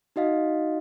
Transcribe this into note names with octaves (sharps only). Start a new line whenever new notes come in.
D#4 F#4 D#5 F5